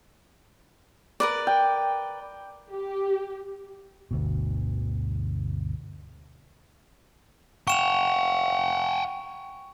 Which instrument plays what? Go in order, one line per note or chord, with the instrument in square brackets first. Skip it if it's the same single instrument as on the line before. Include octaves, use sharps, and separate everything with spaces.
[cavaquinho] A#4 B4 D5
[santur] G5
[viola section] G4
[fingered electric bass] G1 D2 B2
[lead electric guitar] F#5 G5 [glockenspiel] C#6 E7 F7